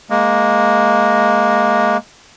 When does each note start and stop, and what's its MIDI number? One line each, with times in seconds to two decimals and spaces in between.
0.10 1.97 56
0.10 1.97 58